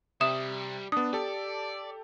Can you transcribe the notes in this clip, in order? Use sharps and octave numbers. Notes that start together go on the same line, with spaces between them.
C3 G3 E5 D#6 E7
B3 D4 D#6
G4 A4 D5